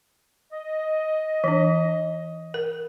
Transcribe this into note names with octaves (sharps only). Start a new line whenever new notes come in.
D#5
E3 D4
A#4